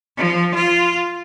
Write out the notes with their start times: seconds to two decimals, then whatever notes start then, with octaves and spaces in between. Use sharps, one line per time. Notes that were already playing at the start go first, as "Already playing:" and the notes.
0.17 F3
0.54 F4